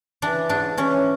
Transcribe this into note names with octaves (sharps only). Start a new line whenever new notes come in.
E3 D4
G#2 D4
E3 C#4